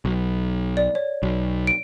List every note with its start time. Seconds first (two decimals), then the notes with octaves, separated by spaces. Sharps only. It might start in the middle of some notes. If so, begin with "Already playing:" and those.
0.05 B1
0.77 D5
0.95 C#5
1.23 B1
1.67 D7